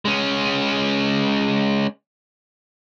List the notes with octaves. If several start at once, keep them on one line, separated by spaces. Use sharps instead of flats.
G#3 C#4